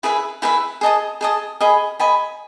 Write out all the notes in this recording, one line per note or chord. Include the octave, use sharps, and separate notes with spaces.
E4 G#4 B4 E5
E4 G#4 B4 E5
G#4 D#5 A5 D#6
G#4 D#5 A5 D#6
G#4 D#5 G#5 B5
G#4 D#5 G#5 B5